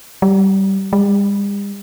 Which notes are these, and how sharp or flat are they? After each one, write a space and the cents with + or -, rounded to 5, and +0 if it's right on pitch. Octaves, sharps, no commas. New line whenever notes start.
G3 -15
G3 +45